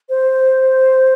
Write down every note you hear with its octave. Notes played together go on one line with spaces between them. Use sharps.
C5